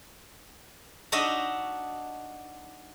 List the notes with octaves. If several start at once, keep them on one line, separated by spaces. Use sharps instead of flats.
D4 D#4 F#4 D#5 E5